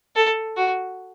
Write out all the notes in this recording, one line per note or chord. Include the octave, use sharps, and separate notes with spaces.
A4
F#4